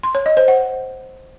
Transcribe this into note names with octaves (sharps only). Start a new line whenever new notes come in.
C6
C#5
D#5
C5
F#5